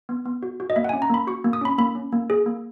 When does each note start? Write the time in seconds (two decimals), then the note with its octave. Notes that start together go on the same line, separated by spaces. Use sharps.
0.09 B3
0.25 B3
0.43 F#4
0.60 F#4
0.70 D#5
0.76 A#3 E5
0.84 F#5
0.89 C#4 G#5
1.02 A#5
1.10 A#3 B5
1.27 F#4 C#6
1.44 A#3
1.53 D#6
1.61 C#4 B5
1.78 A#3 B5
1.95 C#4
2.12 A#3
2.30 G#4
2.46 A#3